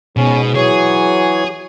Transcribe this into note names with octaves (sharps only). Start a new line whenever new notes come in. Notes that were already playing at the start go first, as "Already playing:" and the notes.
G#2 B2 C#4
E3 F#3 G#4 C#5